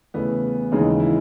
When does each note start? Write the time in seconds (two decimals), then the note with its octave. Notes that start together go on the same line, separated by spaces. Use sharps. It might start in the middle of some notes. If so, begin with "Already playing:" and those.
0.14 E2 C#3 E3 A3 B3
0.72 D#2 C#3 E3 G#3 D#4
1.00 E4